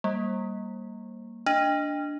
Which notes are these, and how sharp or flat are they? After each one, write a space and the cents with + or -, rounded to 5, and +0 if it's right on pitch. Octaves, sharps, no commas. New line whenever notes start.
G3 +0 A#3 +0
D4 +0 D#5 +0